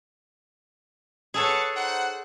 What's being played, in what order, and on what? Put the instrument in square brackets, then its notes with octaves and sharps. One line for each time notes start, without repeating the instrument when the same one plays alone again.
[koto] G#4 A4 C#5 [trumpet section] B4 F#5 A5
[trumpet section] D#4 C5 F#5